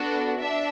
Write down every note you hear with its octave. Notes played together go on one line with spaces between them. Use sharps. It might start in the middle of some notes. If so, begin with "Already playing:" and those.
Already playing: B3 D4 F#4 A4
D4 E5